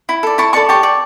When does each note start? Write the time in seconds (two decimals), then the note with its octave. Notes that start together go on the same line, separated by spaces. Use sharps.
0.09 E4
0.23 A4 D5
0.38 E4 A5 C#6
0.53 A4 D5 A5 C#6
0.69 G4 A5 C#6
0.83 D5